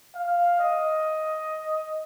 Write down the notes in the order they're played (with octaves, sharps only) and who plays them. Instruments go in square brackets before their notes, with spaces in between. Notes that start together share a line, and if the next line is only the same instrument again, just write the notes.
[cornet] F5
D#5